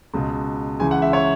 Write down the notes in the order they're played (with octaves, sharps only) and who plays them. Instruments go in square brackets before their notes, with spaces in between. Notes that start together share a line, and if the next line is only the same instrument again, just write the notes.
[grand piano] C#2 B2
C#2 C#3 E3 G#5
F#5
E5
C#5